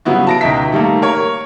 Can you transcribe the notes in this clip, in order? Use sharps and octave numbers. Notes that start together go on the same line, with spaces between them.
C#3 F#3 G3 B3 E4 F#4
A5 A#6 D7
C#2 B2 D#4 E5 B6
D#3 G3 A3 A#3
A#4 C#5